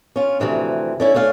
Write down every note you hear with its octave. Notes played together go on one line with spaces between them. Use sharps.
C#4 F4
D2 C3 E3 F3
D3 C#4 E4
A3 C#4 D4 F5